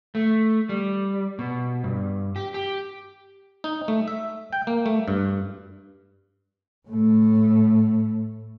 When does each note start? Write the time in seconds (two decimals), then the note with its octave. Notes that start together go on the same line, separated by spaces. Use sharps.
0.15 A3
0.69 G3
1.39 B2
1.84 G2
2.36 G4
2.54 G4
3.64 D#4
3.88 A3
4.08 E5
4.53 G5
4.67 A#3
4.86 A3
5.08 G2
6.88 A2 A3